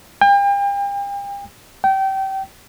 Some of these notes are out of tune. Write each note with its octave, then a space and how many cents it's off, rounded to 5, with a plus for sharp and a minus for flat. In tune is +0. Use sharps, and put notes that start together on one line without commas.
G5 +40
G5 -25